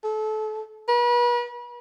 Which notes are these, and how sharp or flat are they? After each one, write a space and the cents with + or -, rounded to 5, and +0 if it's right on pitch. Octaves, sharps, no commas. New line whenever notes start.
A4 -30
B4 -40